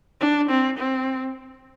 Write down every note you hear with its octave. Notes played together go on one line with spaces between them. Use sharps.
D4
C4
C4